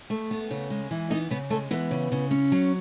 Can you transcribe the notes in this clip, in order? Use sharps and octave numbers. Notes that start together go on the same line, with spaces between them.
A3
B3
C#3
G#3
E3
B3 D#4 D#5
C#3 B3 B4
G#3 A3 A4
E3 B3 B4
C#3
C#3
C#4
F#3